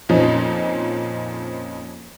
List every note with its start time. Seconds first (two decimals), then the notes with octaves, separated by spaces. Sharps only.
0.09 F2 A#2 F3 C#4 D#4